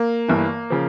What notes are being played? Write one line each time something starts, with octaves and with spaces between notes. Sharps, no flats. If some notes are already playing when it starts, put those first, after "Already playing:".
Already playing: A#3
G1 G2 E3
C#3 F3